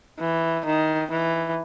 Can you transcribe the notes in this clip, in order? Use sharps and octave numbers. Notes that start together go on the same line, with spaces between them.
E3
D#3
E3